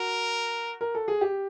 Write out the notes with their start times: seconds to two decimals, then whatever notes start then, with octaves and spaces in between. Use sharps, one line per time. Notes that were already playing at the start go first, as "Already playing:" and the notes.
Already playing: F#4 A#4
0.81 A#4
0.95 A4
1.08 G#4
1.21 G4